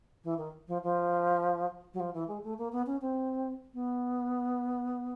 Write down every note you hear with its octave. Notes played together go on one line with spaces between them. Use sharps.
E3
D#3
F3
F3
F#3
F3
E3
G#3
A3
A#3
B3
C#4
C4
B3